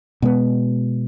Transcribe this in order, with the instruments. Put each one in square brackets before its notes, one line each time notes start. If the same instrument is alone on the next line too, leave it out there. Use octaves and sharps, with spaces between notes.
[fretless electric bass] B2 G#3 B3